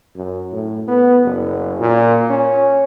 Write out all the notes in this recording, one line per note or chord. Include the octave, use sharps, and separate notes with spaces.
F#2
A2
B3
F#1
A#2
C#4